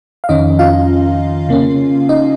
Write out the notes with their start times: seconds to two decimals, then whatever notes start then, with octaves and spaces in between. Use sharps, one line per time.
0.24 F5
0.29 F2 D#3 C#4 D#4 D#5
0.59 F4 F5
1.49 C#3 A#3 C#4
2.09 D#4 D#5